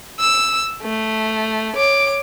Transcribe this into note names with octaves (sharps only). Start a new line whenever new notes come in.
E6
A3
C#5 D6